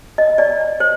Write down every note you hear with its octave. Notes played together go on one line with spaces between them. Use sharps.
D#5
D5
C5